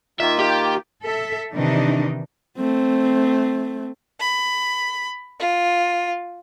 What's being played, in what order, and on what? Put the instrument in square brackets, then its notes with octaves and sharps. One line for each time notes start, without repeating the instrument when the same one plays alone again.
[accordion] D#3 A#3 F4 [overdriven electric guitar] E5
[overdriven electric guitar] G4
[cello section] A4 E5
C3 D#3 E3 D4 D#4
[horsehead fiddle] A3 C4
[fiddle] B5
F4